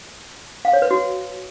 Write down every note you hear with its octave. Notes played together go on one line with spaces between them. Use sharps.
F5
C#5
B4
F#4